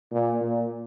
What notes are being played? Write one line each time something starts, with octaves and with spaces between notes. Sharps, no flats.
A#2
A#2